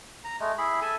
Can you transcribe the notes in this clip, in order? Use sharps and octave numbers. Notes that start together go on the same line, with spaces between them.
A#5
G#3 A3
E4 G#4 B5
A4 E5 G#5